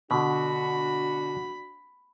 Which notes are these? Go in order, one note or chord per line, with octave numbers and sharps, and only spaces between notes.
B2 D3 D4 F#4 B5